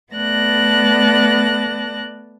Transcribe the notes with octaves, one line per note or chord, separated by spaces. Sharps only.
A3 B3 D5 A5 F#6 A#6